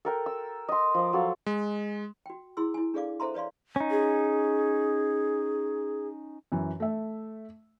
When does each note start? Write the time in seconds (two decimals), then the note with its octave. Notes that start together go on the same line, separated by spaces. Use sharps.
0.05 A4 A#4 G5
0.26 E6
0.69 D#5 C6
0.94 F3 D6
1.13 F#3 A4 F5
1.46 G#3
2.26 F#4 G5
2.57 E4 G#4 C6 E6
2.74 E4 G#5
2.94 D4 G#4 A4 D5 F5 D6
3.20 A4 C5 E5 A#5 C6
3.34 B4 C#5 D5 F5 C6
3.76 C#4 D#4
3.91 G#4
6.52 F#2 E3
6.80 A3 E5